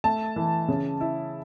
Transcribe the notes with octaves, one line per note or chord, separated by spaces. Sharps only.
A3 A5
E3
C#3
E4